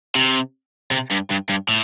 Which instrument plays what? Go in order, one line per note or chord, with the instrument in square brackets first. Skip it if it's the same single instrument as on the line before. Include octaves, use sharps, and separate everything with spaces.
[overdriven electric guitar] C3
C3
G2
G2
G2
A2